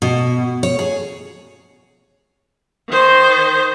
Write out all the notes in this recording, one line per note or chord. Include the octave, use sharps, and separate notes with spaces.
B2
C#5
G#4
D#3 C5